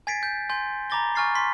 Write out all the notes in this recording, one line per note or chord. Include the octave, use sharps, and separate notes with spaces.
G#5 G#6 A6 B6 C7 D7
G6
G#5 C6 G6
A#5 B5 D6 A6 A#6 G7
G#5 C#6 F6 A6 C7
C6 B6